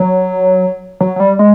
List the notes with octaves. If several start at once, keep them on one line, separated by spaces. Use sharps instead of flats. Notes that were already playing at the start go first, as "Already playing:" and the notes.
Already playing: F#3
F#3
F#3
G3
G#3